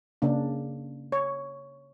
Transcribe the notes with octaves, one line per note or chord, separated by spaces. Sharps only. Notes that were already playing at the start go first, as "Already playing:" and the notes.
C#3 A#3 D4
C#5